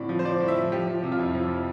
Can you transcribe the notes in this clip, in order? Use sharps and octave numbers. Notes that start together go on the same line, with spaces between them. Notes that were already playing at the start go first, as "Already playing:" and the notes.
Already playing: A2 D3 C4 D5
F3
C5
F3 D5
A2
E5
F3
F3 G4
F3
C3
F4
F2 E4
F3